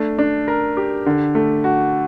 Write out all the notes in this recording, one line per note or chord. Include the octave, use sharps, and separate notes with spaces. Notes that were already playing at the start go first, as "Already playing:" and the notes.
Already playing: A3 D4
D4
A#4
G4
D3
A3
F#4